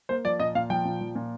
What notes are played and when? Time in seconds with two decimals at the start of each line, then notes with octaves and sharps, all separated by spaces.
0.09 A#3 C5
0.25 F3 D5
0.40 A#2 D#5
0.55 A#2 F5
0.70 F3 G5
0.85 A#2
1.01 F3
1.15 A#2